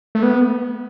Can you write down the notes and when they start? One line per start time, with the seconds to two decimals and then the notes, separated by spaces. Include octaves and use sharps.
0.15 A3
0.23 B3